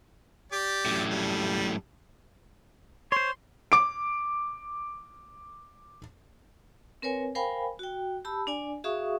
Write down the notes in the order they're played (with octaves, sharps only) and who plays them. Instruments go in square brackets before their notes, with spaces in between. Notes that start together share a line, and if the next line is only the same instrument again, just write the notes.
[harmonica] G4 D5
[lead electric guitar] F#2 A2
[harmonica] G3
[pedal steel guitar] C5 C#5 [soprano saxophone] C6
[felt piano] D6 D7
[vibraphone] C4 A#4 B4 C#5 G#5
A#4 C5 F5 G5 G#5 B5
F#4 G5
G4 A5 B5 E6
D4 D5 G#5
F#4 G#4 E5 F5 C#6 D#6